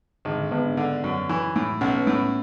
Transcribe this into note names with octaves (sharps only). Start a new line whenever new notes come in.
G#1 D3
D3
G#1 B3
D4
D3
F#2
E3
A2
B1 C#4
B3
A2
C#4